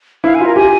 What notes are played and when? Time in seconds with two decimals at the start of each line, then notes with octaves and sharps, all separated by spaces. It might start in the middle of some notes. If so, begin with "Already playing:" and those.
0.24 E4 F5
0.35 G#5
0.41 F4 A#4
0.56 G4 G#5